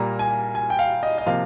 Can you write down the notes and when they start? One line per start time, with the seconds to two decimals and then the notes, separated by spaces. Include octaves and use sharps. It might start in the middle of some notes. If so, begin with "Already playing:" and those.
Already playing: A#2 G3 A#3 A#5
0.19 G#5
0.55 G#5
0.70 G5
0.79 F5
1.03 D#5
1.18 D#5
1.26 C3 F3 A#3 F5